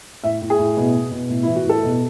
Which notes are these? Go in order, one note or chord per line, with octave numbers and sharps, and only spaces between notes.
A2 E5
A2
G#4
A2
B2
B2
B2
A2
E4
E3
F#4
A2 A4
B2